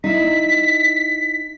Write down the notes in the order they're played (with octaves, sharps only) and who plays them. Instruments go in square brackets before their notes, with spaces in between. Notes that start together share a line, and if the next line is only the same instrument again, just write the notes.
[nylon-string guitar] D#4 E4 [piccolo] B6